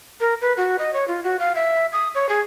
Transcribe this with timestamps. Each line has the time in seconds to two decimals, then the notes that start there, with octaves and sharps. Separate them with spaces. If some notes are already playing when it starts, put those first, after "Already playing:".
0.20 A#4
0.41 B4
0.57 F#4
0.79 D#5
0.94 C#5
1.08 F4
1.24 F#4
1.39 F5
1.55 E5
1.93 D#6
2.15 C#5
2.29 G#4